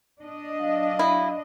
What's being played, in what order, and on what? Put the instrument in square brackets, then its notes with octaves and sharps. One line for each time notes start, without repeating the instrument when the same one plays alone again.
[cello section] D4 D#5
[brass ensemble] F#3 F5
[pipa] E4